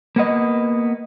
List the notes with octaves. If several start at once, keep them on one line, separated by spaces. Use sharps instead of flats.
A#3 B3 D#5